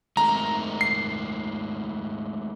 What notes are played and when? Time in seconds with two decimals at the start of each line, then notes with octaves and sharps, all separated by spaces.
0.17 D#3 G#3 A3 A#5
0.81 C7